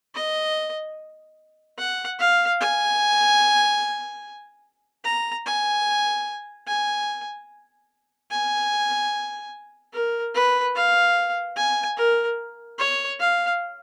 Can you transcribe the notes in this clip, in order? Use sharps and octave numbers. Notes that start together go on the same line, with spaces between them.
D#5
F#5
F5
G#5
A#5
G#5
G#5
G#5
A#4
B4
F5
G#5
A#4
C#5
F5